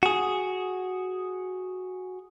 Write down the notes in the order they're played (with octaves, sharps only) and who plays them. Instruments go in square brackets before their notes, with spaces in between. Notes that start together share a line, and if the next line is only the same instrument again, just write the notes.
[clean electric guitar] F#4 G#4